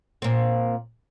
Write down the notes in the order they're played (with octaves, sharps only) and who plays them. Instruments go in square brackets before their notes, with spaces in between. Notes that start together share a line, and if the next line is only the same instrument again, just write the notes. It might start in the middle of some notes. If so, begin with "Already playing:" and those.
[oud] A#2 C4